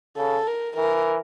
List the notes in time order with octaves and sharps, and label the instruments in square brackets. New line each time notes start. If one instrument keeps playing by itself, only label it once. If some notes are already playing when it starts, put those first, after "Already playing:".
[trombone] C#3 [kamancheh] A4
[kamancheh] A#4
[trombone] E3 [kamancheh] A#4